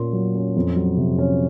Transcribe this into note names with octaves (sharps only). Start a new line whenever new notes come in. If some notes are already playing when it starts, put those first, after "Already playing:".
Already playing: A#2 A#3 C#4 C6
F#3
C#4
F2
F#3
C3
C#4